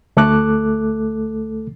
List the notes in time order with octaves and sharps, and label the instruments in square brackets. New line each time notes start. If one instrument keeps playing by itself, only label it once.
[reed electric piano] D2 A3 A4 D6 F#6